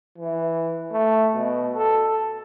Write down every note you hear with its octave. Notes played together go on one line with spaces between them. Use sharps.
E3
A3
B2
A4